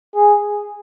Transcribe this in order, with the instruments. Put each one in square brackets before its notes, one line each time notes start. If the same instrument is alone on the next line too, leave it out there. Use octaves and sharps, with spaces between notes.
[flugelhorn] G#4